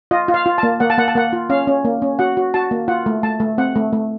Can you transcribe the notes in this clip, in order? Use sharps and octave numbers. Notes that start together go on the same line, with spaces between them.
F4 D#5
F4
F5
F4
A#3 A5
A#3 F#5
A5
A#3 F#5
A5
A#3 F#5
F4
C#4 F5
C#4
A#3
C#4
F#4 F#5
F#4
F#4 A5
A#3
F4 F#5
A3
A3 A5
A3
C4 F#5
A3
A3